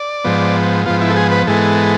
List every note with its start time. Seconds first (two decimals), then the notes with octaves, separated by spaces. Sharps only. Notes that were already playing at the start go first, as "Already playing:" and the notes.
Already playing: D5
0.24 G#2 F3 B3
0.86 G#2 F3 B3 F4
1.01 E4
1.10 A4
1.17 G#4
1.32 B4
1.47 G#2 E3 G#3 B3 A4